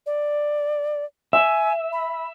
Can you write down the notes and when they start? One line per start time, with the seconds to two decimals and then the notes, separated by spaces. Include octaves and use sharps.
0.06 D5
1.33 E5 G#5
1.92 B5